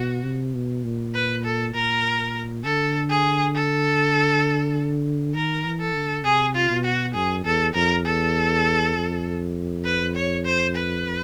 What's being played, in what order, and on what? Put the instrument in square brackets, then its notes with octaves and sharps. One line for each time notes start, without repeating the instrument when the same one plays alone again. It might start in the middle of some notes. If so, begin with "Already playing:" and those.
Already playing: [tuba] B2 [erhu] F#4
[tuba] C3
B2
A#2
[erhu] B4
A4
[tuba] A#2 [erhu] A#4
[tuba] D3 [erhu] A4
[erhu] G#4
A4
[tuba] D#3 [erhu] A#4
[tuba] E3
[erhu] A4
[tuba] D3
[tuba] C3 [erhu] G#4
[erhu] F4
[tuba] B2
[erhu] F#4
[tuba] F#2 [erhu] G#4
[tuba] E2 [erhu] A4
[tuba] F2 [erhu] A#4
[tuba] E2 [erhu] A4
[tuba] F2
[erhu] B4
C#5
C5
B4